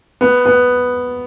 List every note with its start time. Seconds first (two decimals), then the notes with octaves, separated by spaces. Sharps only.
0.21 B3
0.46 B3